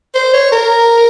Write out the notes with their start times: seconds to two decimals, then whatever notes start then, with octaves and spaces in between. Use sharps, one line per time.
0.15 C5
0.33 C#5
0.52 A#4